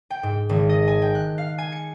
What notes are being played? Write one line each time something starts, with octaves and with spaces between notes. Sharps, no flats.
G5
G#2
G#1
D#5
G#5
G5
F#6
F5
G#5
C#7